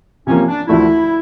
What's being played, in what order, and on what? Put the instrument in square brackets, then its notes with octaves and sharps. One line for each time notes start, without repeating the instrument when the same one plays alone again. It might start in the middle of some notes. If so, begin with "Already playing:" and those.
[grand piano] C3 F3 A#3 [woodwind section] C#4
[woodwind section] D4
[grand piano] D2 D3 F3 A3 [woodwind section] E4